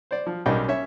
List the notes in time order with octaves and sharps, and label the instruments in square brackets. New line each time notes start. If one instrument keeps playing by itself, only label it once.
[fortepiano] C5 D5
F3
B1 G3 C#4 D#4 A#4 G5
C#4 C#5 E5